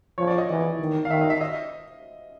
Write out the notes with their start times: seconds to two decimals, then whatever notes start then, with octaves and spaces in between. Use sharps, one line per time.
0.18 F3 C#5
0.27 D5
0.38 D#5
0.49 E3
0.79 D#3
1.05 F5
1.09 D#3 E5
1.21 D#5
1.30 E5
1.41 D#5